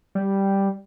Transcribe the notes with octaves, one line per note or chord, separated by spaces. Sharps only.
G3